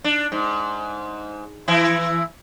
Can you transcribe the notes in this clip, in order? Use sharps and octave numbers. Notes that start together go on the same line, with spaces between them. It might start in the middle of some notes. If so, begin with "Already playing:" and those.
D4
G#2
E3 E4